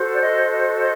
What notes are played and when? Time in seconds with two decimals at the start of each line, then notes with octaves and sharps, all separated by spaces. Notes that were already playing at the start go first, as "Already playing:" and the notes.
Already playing: F#4 A4 C5
0.13 D5
0.22 D#5
0.50 D#5
0.79 D#5